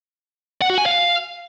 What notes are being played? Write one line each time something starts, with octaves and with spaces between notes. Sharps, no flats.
F#5
F#4
G#5
F5